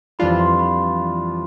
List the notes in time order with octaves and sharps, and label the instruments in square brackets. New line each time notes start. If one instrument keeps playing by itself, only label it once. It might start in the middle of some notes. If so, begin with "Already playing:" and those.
[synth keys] F2 E3 G3 D4 F4 [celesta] B5
[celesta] C6
B5